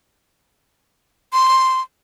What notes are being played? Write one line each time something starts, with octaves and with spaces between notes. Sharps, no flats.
C6